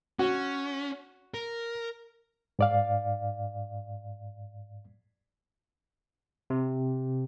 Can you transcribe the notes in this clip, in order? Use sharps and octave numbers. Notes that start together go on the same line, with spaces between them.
C#4 F#4
A#4
G#2 D5 F5
C3